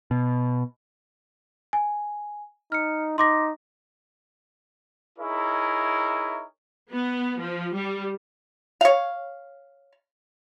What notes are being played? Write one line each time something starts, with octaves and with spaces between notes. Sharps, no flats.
B2
G#5
D#4 F6 C#7
D#4 C6 D6 A#6
D#4 E4 G#4 A#4 C#5 E5
B3
F3
G3
C#5 F5